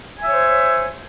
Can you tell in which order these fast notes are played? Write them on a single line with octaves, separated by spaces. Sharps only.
G#5 E5 C#5 C5